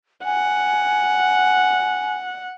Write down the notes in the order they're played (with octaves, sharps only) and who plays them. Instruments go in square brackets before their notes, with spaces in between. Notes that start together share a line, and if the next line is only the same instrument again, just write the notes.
[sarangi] F#5 [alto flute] G#5